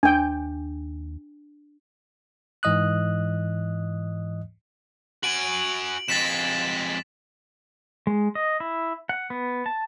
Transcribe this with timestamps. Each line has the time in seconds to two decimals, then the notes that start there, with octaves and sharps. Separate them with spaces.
0.03 D#2 D4 G5 G#5
2.63 G#2 E3 D#5 D#6 F#6
5.23 F#4 G#5 D7 F#7
6.08 F2 G#3 A6 B6 E7
8.07 G#3
8.35 D#5
8.60 E4
9.09 F#5
9.30 B3
9.66 A5